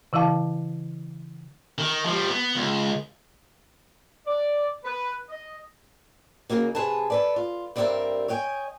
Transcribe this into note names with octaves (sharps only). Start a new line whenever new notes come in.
C#3 E3 E4 F5 A5
D#3
F3 G3
B3
C#2
D5
B4
D#5
C#3 F3 F#3 A#3 D#4
C3 G#4 B4 A5
A4 B4 D5
F4
G2 G3 C4 G#4 A#4 E5
C#5 D#5 G5 G#5